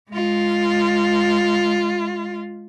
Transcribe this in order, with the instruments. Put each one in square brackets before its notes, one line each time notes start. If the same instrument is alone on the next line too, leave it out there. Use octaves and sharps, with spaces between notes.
[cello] G#3 F4